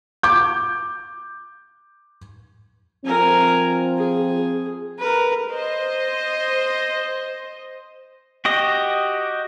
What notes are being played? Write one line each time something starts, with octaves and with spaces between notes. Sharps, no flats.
D6 G6
F3 C4 A#4 G#5
G#4
A#4 B4
C5 D#5
F#4 G4 D#5